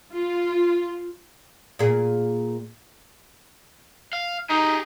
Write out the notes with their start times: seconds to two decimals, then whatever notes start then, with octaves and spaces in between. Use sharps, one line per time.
0.12 F4
1.79 A#2 G#4
4.13 F5
4.50 D#4 G4 G#4